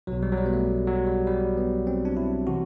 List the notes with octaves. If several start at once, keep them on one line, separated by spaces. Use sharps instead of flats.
B1 B2 F#3
G3
F#3
G3
B3
A3
F#3
G3
G3
B3
C4
D4
E4
C3 E3 F#4